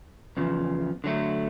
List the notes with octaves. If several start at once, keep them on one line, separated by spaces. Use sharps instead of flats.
E2 C#3 F3
D3 F#3 A3